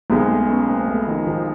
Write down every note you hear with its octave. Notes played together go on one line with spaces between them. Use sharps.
B1 B2 G#3 A#3 C4
A3 B3
B3 C#4
A#3 C4
A3 B3
D#3 F3
D#3 F3